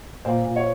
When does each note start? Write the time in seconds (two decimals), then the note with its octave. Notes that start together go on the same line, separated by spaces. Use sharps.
0.25 A#2 C5
0.46 A#2
0.56 C#5